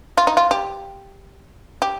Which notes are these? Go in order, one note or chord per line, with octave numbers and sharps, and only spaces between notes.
F4
D#4
F4
G4
G4